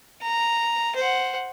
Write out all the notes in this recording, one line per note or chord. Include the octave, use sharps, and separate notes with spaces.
A#5
C5 F#5